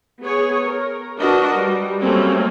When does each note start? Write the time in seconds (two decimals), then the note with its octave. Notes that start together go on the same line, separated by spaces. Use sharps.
0.23 B3 G#4 C#5
0.66 A#4
1.19 D4 F#4 A#4 B4 D#5
1.55 G3
2.00 F#3 G3 A3 A#3 C4 C#4